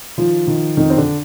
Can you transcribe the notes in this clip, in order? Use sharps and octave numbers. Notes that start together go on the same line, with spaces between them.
D#3 F3 F4
D#3
F2 D#3 D#4
C4
D3 D4